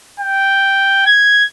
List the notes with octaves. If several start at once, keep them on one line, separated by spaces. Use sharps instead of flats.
G5
G#6